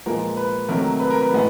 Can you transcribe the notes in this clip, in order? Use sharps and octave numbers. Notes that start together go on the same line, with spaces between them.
A#2 F3 G#3 B3 A#4
B4
C3 D#3 F#3 A3 A#4
B4
A#4
B4
A2 E3 G#3 B3